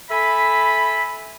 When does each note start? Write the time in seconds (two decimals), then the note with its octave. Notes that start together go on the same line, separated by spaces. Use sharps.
0.10 A4 E5 G#5 B5